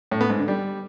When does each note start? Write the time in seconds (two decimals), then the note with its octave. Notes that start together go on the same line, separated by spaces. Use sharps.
0.12 A2
0.21 B3
0.30 G#2
0.39 D3
0.48 G3